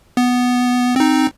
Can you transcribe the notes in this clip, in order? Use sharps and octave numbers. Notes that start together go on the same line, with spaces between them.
B3
C4 D#4